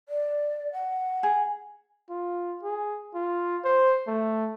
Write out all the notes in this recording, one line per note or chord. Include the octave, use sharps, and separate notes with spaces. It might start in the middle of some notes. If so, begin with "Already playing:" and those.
D5
F#5
G#4
F4
G#4
F4
C5
A3